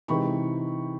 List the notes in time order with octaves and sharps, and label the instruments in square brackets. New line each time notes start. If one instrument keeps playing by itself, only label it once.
[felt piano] C3 E3 G#3 C4 D#4 B5 C#6